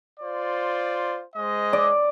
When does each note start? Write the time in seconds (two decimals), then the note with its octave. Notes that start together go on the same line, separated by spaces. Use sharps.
0.20 F4 C5 D5
1.35 G#3 C5 D#5
1.73 D5